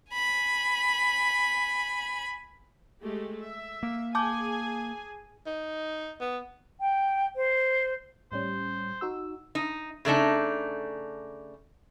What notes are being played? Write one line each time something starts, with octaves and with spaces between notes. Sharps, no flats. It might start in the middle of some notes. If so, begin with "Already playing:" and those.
G#5 B5
G#3 A3 G4
E5
A#3
G#4 G#5 A5 D6 G6
D#4
B3
G5
C5
A2 G3 C#4 C5
D#4 F#4 E6
D#4
C#3 A3 D4 D#4